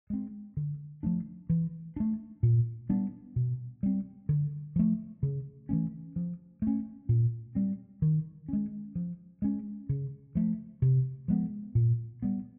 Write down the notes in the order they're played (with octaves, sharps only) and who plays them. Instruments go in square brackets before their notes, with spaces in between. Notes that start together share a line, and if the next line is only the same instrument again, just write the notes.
[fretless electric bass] G#3 C4
D3
F3 A3 D4
E3
A3 D4
A#2
G3 B3 D4
B2
G3 C4
D3
F3 A3
C#3
E3 A3 C#4
F3
A3
C#4
A#2
G3 C4
D#3
G#3 C#4
F3
G#3 C#4
C#3
F3 A3
C3
F3 G#3 B3
A#2
G3 B3